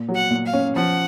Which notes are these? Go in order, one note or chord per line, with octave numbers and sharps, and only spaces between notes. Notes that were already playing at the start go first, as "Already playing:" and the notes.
Already playing: A#2
F#3
F#5
A#2
F5
C#4
F3 F#5